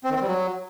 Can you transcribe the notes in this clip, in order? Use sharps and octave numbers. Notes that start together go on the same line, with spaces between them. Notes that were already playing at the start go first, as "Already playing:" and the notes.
C4
D#3
C4
G3
F#3